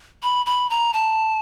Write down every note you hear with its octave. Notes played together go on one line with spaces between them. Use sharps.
B5
B5
A#5
A5